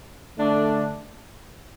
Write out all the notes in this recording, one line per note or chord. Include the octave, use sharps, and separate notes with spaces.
D3 A3 D4